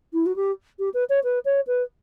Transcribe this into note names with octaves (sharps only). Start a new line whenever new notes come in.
E4
F#4
G4
G4
B4
C#5
B4
C#5
B4